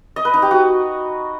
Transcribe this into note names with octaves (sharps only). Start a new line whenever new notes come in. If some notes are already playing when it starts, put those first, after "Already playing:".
D#5
B4
D#4
G4
F#4